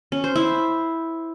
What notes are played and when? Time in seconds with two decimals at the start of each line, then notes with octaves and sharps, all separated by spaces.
0.12 C#4
0.24 C5
0.36 E4